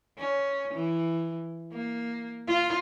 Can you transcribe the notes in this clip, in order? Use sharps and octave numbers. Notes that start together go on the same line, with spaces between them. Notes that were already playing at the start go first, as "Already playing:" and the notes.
C#4
E3
A#3
F4